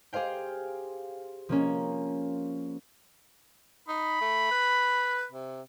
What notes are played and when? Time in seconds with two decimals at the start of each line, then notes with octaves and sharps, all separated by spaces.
0.13 G4 G#4 C5 F5 G5
1.49 F3 A#3 C#4
3.88 D#4 B5
4.21 A3
4.51 B4
5.32 C3